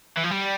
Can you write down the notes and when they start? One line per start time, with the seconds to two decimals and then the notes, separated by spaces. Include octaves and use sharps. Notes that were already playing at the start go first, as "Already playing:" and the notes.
0.18 E3
0.24 F3
0.31 G3